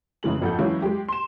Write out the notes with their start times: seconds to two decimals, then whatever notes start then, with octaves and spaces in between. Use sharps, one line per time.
0.23 F1 C#3 E3 G#3 F#7
0.41 A#1 F2 A4 F#5 G6
0.59 E3 F#3 G#3 C#4 E4 F4
0.82 G#3 G4
1.09 C6 E7